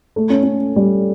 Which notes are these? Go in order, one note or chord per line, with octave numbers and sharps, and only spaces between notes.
A3
C#4
C#4
G3